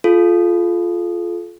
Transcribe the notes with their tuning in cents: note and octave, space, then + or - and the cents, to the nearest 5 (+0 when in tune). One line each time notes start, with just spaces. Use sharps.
F4 +0 A4 -35